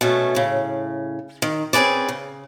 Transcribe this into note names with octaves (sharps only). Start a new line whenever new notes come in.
B2 A3 C#4
A2 C#3
D#3
C4 C#4 G#4 B4 D5
C#3